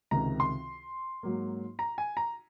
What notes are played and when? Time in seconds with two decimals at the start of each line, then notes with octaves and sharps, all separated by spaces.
0.11 C#2 C3 D#3 A#5
0.40 C6
1.23 G#2 F#3 A#3
1.79 A#5
1.98 G#5
2.17 A#5